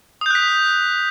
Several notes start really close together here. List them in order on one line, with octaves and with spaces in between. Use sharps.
D#6 G6 F#6 B6